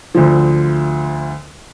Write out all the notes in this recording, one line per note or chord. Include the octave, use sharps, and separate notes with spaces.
D2 D3 F3